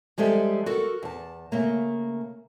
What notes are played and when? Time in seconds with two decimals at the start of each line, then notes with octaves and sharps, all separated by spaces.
0.18 F3 G3 G#3 A4 E5
0.66 F#4 A4 A#4
1.03 E2 A5
1.52 C#3 A3 A#3